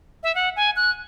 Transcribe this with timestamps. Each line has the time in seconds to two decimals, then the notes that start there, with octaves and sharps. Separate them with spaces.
0.23 E5
0.35 F#5
0.56 G#5
0.76 F#6